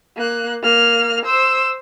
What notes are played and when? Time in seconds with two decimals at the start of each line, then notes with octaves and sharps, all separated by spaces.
0.16 A#3 F#6
0.62 A#3 F6
1.25 C5 E6